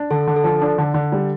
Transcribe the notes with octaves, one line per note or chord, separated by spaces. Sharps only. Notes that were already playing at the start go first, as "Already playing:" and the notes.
Already playing: D4
D3 A4
D3
A4
F3
D4
D3
D3
G3